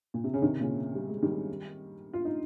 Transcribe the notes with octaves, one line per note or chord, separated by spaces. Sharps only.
A#2
C3
C#3
C3 D#3
A#2 C#3
G3
G#3
D#3 G3
F4
D#4